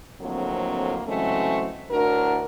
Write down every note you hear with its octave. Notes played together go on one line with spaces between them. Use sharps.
F2 A2 D3 F#3 A#3 C4
C#3 E3 F#3 G#3 A3 C4
D2 A2 D4 F#4 A#4